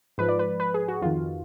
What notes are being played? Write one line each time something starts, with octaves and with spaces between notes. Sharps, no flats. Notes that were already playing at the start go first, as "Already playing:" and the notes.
G#2 F3 B4
D5
B4
B4
G#4
F#4
F2 D#3 F4